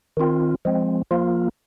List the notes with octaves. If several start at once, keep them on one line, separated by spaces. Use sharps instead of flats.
D#3 C4 F4
F3 G#3 C4
F3 A#3 F4